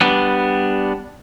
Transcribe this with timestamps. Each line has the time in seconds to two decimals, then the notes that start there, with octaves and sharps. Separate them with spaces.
0.01 G3 B3 D4